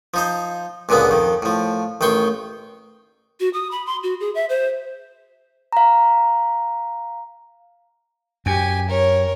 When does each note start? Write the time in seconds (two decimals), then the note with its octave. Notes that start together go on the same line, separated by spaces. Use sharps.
0.14 F3 D#4 C5
0.89 C#2 A#2 D3 G#3 B3
1.11 F2 D#3
1.42 A2 F3
2.01 A1 D#3 G5 C6 C#6
3.40 F#4
3.53 D#6
3.71 B5
3.86 C6
4.03 F#4
4.20 G#4
4.35 E5
4.49 C5
5.72 F5 A#5
8.46 F#2 G4 G#5
8.89 A#4 C#5